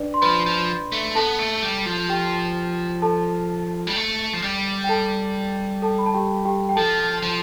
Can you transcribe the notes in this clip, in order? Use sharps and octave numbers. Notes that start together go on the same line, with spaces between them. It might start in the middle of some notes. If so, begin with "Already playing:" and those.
Already playing: D4 B4 D5
C6
F3 B4 B5
F3
A3
B3 A4 A5
A3
G3
F3
G4 G5
A4 A5
G3
A3
F3
G3
G5
A4 A5
A4 A5
B5
A5
G4 G5
G4 G5
G5
F3 A4 A5
F3